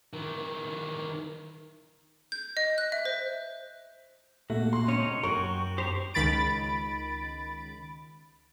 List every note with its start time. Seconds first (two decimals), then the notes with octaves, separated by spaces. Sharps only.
0.13 D#3 E3
2.32 G6
2.57 D#5
2.78 F#6
2.92 E5
3.05 C5
4.50 A#2 A3 A#3 F#4
4.73 C6
4.88 C#2 C#4 D#4 C#5
5.24 F#2 F#3 F#4 A#4 G5 C#6
5.78 G4 C5 A#5 C#6
6.14 C#2 D#3 B5 A6 D7